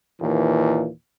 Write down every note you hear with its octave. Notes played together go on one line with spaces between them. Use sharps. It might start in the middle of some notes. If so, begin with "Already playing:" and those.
D#2 A#2 E3